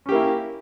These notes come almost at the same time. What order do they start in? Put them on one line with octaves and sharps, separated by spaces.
C#4 G4 A#3 E4